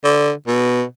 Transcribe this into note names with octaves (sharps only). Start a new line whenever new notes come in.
D3
B2